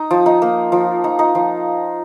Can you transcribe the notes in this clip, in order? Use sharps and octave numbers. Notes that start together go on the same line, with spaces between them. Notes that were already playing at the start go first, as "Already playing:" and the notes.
Already playing: D#4 D#5
F3
D#4 D#5
A#3
F3
D#4
D#4 D#5
F3